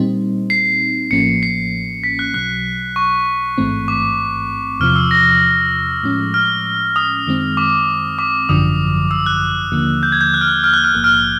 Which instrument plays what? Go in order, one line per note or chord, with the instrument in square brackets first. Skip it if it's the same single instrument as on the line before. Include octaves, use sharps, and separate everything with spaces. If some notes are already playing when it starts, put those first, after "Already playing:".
Already playing: [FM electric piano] A#2 G3 C4 D#4
[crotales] C7
[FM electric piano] A1 A2 F3 A#3 C#4 [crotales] C#7
[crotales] C7
B6
F#6
[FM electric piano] B1 B2 F#3 [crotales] F#6
[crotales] C#6
[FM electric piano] A1 G#2 E3 A3 C4
[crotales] D6
[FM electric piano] E2 C3 F3 [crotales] F6
[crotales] E6
A#6
[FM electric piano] A2 F3 G#3 C#4
[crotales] F6
D#6
[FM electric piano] F#2 D#3 G#3 C4
[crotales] D6
D6
[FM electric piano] G#1 F#2 D3 F3 [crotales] D#6
[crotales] E6
F#6
[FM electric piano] D#2 D3 F3 A#3
[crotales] G6
G#6
G6
F#6
F6
F#6
F6
F#6
F6
[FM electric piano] A#1 G#2 F3 A#3 [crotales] F#6
[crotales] F6